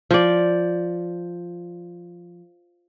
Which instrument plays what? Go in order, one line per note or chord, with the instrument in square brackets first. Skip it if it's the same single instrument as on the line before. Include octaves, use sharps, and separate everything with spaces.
[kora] F3 D5